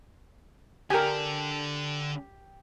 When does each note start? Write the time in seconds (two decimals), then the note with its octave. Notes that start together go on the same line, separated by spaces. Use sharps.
0.90 D3 D4 G4 A#4 G5 G#5